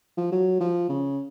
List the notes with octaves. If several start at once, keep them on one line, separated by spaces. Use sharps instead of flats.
F3
F#3
F3
C#3